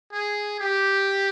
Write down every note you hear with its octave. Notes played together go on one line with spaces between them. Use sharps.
G#4
G4